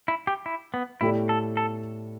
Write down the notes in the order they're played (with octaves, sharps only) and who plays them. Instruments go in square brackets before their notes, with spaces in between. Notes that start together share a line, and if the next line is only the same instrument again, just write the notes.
[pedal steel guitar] E4
G4
E4
B3
[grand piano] A2 A3 G4 D5 [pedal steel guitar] E4
[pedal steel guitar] A4
A4